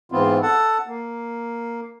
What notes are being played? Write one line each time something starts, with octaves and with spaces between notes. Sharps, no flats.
G#2 E3 B3 C4 F4
A4 F#5 A5
A#3